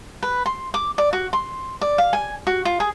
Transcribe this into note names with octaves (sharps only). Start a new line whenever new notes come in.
B4
C6
D6
D5
F#4
C6
D5
F5
G#5
F#4
F4
G#4